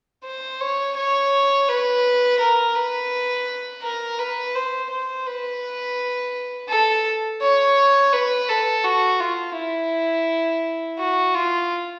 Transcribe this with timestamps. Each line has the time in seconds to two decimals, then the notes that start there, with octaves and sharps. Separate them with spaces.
0.25 C5
0.61 C#5
0.96 C#5
1.68 B4
2.40 A#4
2.75 B4
3.83 A#4
4.18 B4
4.55 C5
4.90 C5
5.26 B4
6.69 A4
7.41 C#5
8.13 B4
8.49 A4
8.85 F#4
9.20 F4
9.56 E4
10.99 F#4
11.35 F4